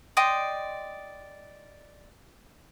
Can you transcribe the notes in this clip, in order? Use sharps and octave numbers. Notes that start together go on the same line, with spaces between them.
D5 D#5 G5 C6